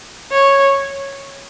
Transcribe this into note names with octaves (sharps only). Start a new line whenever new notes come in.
C#5